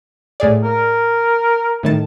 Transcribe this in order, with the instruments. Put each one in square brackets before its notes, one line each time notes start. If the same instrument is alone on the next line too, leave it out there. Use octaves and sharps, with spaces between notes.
[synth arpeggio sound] A2 G#4 D5
[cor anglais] A#4
[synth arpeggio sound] A2 D#3 A5